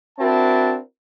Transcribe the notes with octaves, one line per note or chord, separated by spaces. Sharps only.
C4 D4 E4 F#4 A#4 A5